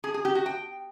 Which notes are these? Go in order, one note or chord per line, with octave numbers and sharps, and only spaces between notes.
G#4
G#4
G4
F#4
G5